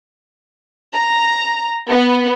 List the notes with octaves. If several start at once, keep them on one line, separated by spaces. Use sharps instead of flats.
A#5
B3